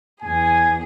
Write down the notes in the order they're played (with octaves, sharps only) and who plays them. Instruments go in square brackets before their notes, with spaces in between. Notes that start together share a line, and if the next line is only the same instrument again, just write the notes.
[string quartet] E2 G#4 [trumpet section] G#5